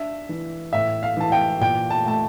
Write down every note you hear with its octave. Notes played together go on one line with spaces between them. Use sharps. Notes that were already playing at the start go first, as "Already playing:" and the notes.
Already playing: D4 E5
E3
A2 E5
F5
E3 A5
G5
A#2 G5
A5
A3 A5